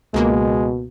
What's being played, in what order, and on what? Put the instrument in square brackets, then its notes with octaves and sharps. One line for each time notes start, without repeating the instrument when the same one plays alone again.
[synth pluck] C#2 A#3 [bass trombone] B2 [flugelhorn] G#3